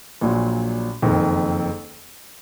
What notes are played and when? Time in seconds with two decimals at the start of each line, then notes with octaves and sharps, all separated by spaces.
0.21 A#1 A#2 F#3
1.02 F#1 F2 D#3